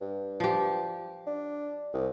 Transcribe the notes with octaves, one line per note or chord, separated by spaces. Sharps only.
G2
F3 G4
D4
C2